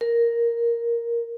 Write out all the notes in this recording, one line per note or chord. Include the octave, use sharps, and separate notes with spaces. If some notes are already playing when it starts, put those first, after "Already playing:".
A#4